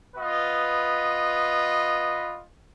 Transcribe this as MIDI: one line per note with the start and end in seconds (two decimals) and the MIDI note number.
0.15 2.41 59
0.15 2.41 65
0.15 2.41 71
0.15 2.41 75